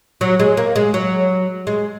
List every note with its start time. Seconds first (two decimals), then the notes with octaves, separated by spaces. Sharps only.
0.21 F#3
0.40 G#3
0.57 A#3
0.76 G#3
0.94 F#3
1.67 G#3